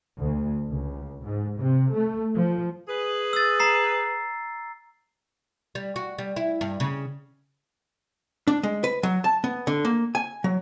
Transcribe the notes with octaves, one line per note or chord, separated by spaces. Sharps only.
D2
C#2
G#2
C3
A3
F3
G#4 B4
E6 A6
A#5 C7
G3
F#4
G3
E4
G2
C#3
D4
G#3
B4
F#3
A5
B3
D3
A#3
G#5
F#3